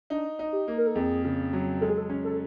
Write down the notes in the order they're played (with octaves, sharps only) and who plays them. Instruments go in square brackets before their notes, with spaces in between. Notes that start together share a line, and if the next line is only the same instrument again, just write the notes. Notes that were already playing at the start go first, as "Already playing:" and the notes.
[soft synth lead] D4 [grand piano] D#4
[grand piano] D#4
[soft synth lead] G4
[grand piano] A#3
[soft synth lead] A#4
A4
[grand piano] F2 [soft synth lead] G#4
[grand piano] C#3
F#3
[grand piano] G#3 [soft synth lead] A4
[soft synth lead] G#4
A4
[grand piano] C#4
[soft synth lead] A4